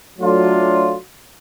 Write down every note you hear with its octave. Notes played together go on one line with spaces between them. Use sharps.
F#3 A3 D4 F4